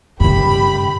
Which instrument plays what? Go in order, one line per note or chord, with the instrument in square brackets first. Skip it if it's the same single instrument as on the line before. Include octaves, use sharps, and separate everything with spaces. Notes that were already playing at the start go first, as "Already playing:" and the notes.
[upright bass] G2 C#3 [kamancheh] G4 B5